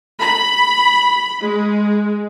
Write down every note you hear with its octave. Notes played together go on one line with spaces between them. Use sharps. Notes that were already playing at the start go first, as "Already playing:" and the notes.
B5
G#3